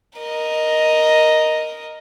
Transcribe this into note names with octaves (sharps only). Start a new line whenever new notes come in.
A#4 D#5